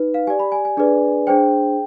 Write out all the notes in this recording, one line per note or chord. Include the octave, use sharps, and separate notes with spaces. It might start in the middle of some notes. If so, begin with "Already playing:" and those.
Already playing: D#4 B4
F5
G4 D5 G#5
B5
G#5
G#5
D4 G#4 B4 D5
D4 G#4 C5 G5